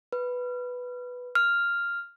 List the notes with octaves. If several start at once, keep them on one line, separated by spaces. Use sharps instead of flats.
B4
F6